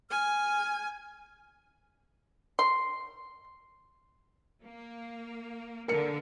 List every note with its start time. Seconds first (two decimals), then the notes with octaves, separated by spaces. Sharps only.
0.11 G#5 F6
2.59 C6
4.63 A#3
5.88 D3 A#3 A#4 C#7